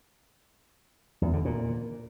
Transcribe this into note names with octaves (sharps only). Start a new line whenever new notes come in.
E2
D3
A#2